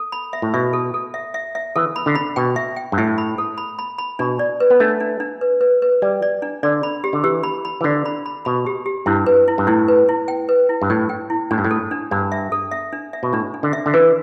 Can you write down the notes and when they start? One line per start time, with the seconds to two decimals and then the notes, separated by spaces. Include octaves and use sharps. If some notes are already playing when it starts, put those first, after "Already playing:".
Already playing: A4
0.12 B5
0.33 E5
0.42 A2
0.54 B2 E5
0.73 A4
0.94 A4
1.14 E5
1.34 E5
1.55 E5
1.76 E3 A4
1.96 B5
2.06 D3
2.15 B5
2.36 B2 G5
2.56 E5
2.76 G5
2.92 G2
2.98 A2 E5
3.18 B5
3.38 A4
3.58 B5
3.79 B5
3.98 B5
4.19 B2 D4
4.39 D5
4.60 B4
4.70 B3
4.80 A3 D4
5.00 D4
5.20 D4
5.41 B4
5.61 B4
5.82 B4
6.02 G3 D5
6.22 D5
6.42 D4
6.63 D3 D5
6.83 B5
7.04 G4
7.13 D3
7.24 E3 G4
7.43 B5
7.65 B5
7.81 E3
7.84 D3 D5
8.06 B5
8.26 B5
8.45 B2 B5
8.66 G4
8.86 G4
9.06 G2 E4
9.26 B4
9.48 E4
9.58 G2
9.67 A2 E4
9.88 B4
10.09 E4
10.28 G5
10.49 B4
10.69 E4
10.82 G2
10.90 A2 G5
11.09 G5
11.30 E4
11.51 A2 D4
11.58 G2
11.65 A2
11.71 A4
11.91 D4
12.11 G2 D4
12.32 E5
12.52 A4
12.71 E5
12.93 D4
13.13 E5
13.23 B2
13.33 A2 D4
13.54 D4
13.63 D3
13.73 E5
13.86 D3
13.94 E3 B4